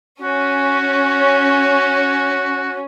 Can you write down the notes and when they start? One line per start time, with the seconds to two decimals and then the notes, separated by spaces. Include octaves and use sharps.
0.22 C#4 F#4